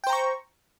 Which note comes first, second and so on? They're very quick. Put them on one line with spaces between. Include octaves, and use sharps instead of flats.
G5 C5 A#5 C#6